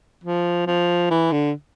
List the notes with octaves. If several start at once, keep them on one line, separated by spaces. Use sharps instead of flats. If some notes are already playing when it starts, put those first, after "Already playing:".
F3
F3
E3
D3